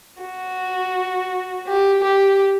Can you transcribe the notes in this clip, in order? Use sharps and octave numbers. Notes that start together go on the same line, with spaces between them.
F#4
G4
G4